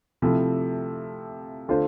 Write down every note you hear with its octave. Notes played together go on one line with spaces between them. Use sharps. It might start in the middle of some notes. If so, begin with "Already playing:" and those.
C3 F3 A3 E4
D3 A3 D4 F4 C5